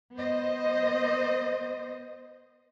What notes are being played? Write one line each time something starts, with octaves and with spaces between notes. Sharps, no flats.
B3 C5 D#5